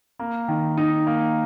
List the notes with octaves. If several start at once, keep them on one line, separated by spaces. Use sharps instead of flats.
A#3
D#3
D#4
A#3